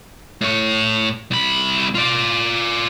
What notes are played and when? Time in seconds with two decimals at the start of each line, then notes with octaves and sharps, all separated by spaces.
0.41 A2 C#5
1.31 C2 B5
1.95 F4 D5